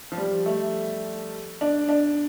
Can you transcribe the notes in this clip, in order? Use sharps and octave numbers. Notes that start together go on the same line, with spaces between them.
F3
G3
A3
D4
D4